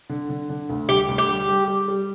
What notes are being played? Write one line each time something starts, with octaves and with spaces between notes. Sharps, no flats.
D3
D3
D3
D2
G3 G4
D2
G4
G3
G3
G3
G3